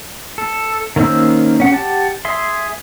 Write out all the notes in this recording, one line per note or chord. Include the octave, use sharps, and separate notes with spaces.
A4
D#3 A#3 C#4 C5 E6
C#4 F#5
G4 F#5 A5
G#4 E5 C6